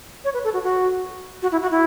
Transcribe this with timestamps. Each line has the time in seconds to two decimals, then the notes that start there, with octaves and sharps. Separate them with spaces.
0.25 C#5
0.34 B4
0.44 A4
0.54 F#4
0.64 F#4
1.42 F#4
1.52 E4
1.62 F#4
1.71 E4